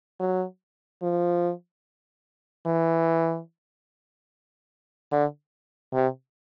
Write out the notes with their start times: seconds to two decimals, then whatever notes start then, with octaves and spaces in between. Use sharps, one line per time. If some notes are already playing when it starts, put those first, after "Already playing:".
0.20 F#3
1.03 F3
2.66 E3
5.12 D3
5.94 C3